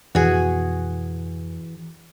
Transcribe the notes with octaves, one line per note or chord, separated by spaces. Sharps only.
F2 G#2 B2 E3 F#4 G#4